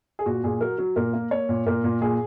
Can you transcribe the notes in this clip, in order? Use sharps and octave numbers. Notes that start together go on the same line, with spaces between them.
G#4
A#2 F#4
A#2 G#4
F#3 A#4
F#3
A#2 A#4
A#3
A#3 C#5
A#2
A#2 A#4
A#2
A#2 G#4